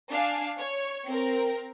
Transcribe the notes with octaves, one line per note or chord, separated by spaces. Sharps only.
D4 F5 G#5
C#5
C4 A#4